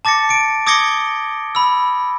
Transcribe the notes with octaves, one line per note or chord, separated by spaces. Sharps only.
A5 D6 A6 A#6 C#7
C#7 D7
D6 D#6 G#6 A#6 C#7 G7
B5 E6